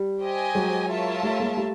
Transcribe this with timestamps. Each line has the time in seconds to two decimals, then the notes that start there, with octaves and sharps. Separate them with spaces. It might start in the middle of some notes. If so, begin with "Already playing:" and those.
Already playing: G3
0.21 G4 C5 D#5 G#5
0.54 F#3 G#3
0.89 F4 A#4 C#5 E5 A5
1.23 G3 A3
1.40 G#3 A#3
1.57 G3 A3